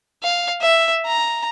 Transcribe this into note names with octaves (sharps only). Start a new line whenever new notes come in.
F5
E5
A#5